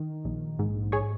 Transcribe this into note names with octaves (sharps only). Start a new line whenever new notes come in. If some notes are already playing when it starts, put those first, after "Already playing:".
Already playing: D#3
A#1
G#2
G#4 C#5